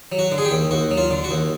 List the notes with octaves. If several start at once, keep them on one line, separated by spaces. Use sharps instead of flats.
F#3
F#4
D3
G#4
G4
D#2
D#2 F#4
F#3
F4
D3
F#4
D#2